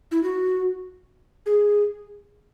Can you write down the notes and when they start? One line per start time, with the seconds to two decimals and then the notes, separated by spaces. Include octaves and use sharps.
0.12 E4
0.23 F#4
1.46 G#4